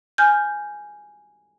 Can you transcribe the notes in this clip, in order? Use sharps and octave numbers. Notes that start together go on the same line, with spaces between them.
G#5 F6 G6